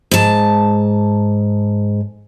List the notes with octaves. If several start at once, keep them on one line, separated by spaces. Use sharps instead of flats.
G#2 A5